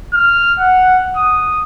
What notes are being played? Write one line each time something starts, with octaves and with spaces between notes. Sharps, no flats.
F6
F#5
D#6